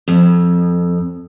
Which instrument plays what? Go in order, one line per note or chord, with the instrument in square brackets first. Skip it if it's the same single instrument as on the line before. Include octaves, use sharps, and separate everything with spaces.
[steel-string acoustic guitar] F2